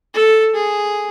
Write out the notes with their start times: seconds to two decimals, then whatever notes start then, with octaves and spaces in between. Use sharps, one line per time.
0.14 A4
0.54 G#4